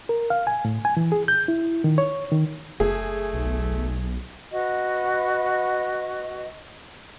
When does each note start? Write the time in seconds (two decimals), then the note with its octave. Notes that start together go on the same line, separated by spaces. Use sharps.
0.09 A#4
0.30 F5
0.47 G#5
0.65 A2
0.85 G#5
0.97 E3
1.12 G#4
1.28 G6
1.48 E4
1.84 D#3
1.98 C#5
2.31 D#3
2.80 F#1 A3 G#4
3.33 B1
4.51 F#4 B4 D#5